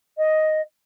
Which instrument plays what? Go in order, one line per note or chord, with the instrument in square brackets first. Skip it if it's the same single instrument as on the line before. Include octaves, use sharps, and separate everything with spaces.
[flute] D#5